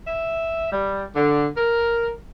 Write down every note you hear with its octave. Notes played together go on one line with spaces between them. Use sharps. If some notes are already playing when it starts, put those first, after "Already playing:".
E5
G3
D3
A#4